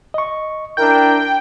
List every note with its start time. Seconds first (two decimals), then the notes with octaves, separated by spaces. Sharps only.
0.14 D#5 C#6
0.77 D4 E4 A#4 G5 G6